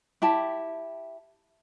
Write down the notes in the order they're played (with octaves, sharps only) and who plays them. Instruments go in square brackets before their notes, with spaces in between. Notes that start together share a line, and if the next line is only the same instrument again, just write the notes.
[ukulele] E4 G4 A5